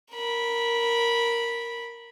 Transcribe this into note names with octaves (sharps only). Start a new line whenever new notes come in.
A#4 B5